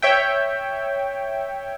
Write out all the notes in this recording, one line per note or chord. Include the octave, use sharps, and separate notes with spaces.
C#5 E5 G5